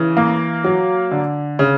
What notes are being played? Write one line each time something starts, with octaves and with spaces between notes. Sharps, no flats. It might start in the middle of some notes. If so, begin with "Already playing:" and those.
Already playing: C#3 E3
A#3
F#3
D3
C#3